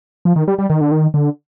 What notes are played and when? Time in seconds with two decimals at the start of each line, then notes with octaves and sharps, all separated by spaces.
0.25 F3
0.36 D#3
0.48 G3
0.58 G3
0.70 D#3
0.81 D3
0.91 D#3
1.14 D3